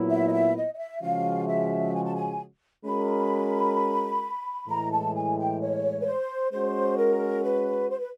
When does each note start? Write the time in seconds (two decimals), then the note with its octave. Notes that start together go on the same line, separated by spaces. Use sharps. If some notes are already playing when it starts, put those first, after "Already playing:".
Already playing: A#2 F#3 B3 E4
0.10 E5
0.27 D#5
0.32 E5
0.56 D#5
0.74 D#5
0.78 E5
1.02 C#3 F3 G#3 C#4 F#4 F5
1.47 E5
1.94 G#5
2.04 A5
2.15 G#5
2.85 G#3 C#4 F#4 A#4 B5
4.68 A2 E3 G#3 A#5
4.91 A5
5.14 G#5
5.37 G5
5.61 C#5
6.01 B4
6.06 C5
6.52 G#3 C#4 F#4 C5
6.98 A#4
7.44 B4
7.89 C5
7.99 B4